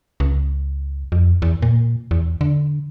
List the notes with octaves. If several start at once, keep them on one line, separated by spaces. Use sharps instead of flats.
C#2
F2
E2
A#2
E2
D3